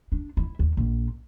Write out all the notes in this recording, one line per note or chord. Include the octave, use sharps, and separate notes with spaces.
D4
E4
D#2
A#1